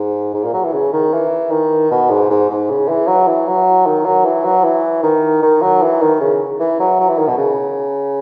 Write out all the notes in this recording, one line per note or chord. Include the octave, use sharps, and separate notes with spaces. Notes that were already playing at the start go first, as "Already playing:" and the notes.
Already playing: G#2
G#2
A#2
F#3
E3
C#3
D#3
E3
D#3
B2
G#2
G#2
G#2
C#3
E3
F#3
E3
F#3
D#3
F#3
E3
F#3
E3
D#3
D#3
F#3
E3
D#3
C#3
E3
F#3
F#3
E3
D#3
B2
C#3